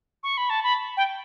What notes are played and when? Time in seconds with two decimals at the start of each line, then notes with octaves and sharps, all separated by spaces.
0.23 C#6
0.37 B5
0.50 A5
0.63 B5
0.97 G5